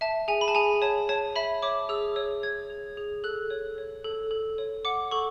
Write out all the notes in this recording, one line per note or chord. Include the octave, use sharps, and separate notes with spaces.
E5 A5
G#4 G#5
B5
A5
G#4 G#5
C#5 A5
C#5 A5
E5 B5
C#5 D6
G#4 E6
C#5 E6
C#5 G#6
G#4
G#4
A4 F#6
C#5
C#5
A4
A4
C#5
F#5 D6
A4 C#6